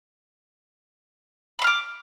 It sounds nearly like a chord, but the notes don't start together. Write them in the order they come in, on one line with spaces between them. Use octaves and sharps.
B5 C6 F6 D6